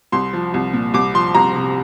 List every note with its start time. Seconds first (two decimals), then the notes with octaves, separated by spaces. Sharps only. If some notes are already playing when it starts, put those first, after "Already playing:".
0.12 C2 C6
0.33 F3
0.54 C2
0.73 A#2
0.94 C2 D6
1.14 F3 C6
1.35 C2 A#5
1.56 C3